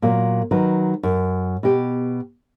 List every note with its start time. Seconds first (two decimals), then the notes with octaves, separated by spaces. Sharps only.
0.02 A#2 F#3 A#3
0.51 D#3 F#3 B4
1.03 F#2
1.63 B2 G4